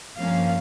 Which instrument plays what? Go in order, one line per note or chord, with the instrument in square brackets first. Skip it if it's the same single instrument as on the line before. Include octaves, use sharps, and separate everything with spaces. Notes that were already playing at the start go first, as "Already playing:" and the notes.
[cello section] G2 F3 A#3 C#4 F5